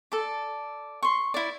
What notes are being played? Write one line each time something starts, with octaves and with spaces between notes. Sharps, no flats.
A4 D5
C6 C#6
E4 D5